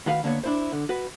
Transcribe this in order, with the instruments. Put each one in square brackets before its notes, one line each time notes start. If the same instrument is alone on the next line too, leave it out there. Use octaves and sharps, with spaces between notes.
[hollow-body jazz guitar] A2 D#3 F#4 B4 F5
D3 A#3 B3 C#5
D4 E4 C5
D3
F#4 B4